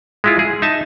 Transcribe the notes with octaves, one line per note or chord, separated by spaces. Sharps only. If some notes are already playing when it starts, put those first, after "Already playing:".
G#3 E4 F4
G#4
D#4 E5 A5